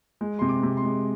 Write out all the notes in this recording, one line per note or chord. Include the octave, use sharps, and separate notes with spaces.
G#3
C3 C6
D6
C3
C6
G#3